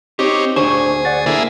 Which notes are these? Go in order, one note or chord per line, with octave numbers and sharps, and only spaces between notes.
C4 D#4 G4 C#5
D2 D4 G#4 C5 C#5
D5 F#5 A6
D3 A#3 E4 G#4